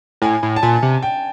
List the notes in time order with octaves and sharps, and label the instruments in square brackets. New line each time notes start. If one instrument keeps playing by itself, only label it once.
[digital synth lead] A2 [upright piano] G#5
[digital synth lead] A2
[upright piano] A5
[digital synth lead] A#2 [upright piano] G#5
[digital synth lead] C3
[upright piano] G5